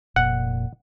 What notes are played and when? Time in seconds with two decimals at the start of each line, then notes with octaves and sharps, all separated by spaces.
0.16 F1 A#2 F#5